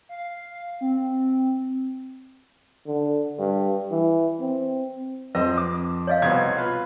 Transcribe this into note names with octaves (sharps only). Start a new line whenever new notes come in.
F5
C4
D3
G2
E3
C4
F2 C4 B4 D#5
D6
C#5 D#5 F5
C2 B2 C4 G#6
F4 B4